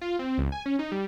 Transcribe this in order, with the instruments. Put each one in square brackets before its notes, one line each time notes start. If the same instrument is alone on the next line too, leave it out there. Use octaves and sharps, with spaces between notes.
[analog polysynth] F4
C4
C#2
G#5
C#4
D#4
G3